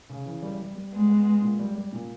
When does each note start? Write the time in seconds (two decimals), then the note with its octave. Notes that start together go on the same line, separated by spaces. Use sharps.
0.10 C#3
0.26 E3
0.43 G3
0.59 G3
0.75 G3
0.92 G#3 B3
1.09 B3
1.25 B3
1.42 A#2
1.59 G3
1.75 G3
1.92 A#2